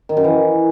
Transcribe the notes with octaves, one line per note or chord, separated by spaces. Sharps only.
D#3
F#2
E3